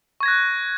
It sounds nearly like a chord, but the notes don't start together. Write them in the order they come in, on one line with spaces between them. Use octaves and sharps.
C#6 G#6 A#6 F#6